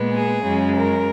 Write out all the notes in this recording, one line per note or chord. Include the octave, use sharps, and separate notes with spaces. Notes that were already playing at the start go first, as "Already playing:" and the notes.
Already playing: A#2 G#3 B3
G#4
F#2 C#3 G#3
A#4